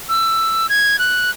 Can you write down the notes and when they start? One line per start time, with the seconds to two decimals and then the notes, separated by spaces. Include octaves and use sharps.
0.09 E6
0.69 G#6
0.99 F#6